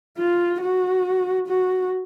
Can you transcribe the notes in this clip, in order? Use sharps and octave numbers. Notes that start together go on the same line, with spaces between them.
F4
F#4
F#4